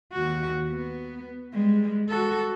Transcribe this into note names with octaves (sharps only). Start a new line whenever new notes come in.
D#2 F#4
B3
G3 G#3
F#4 A4